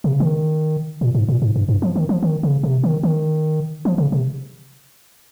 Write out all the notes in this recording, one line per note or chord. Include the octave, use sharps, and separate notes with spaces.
C3
C#3
D#3
A#2
G#2
A#2
G#2
G2
G2
F3
D#3
F3
D#3
C#3
C3
D#3
D#3
F3
C#3
C3